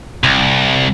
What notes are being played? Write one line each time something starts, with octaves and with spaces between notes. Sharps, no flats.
C2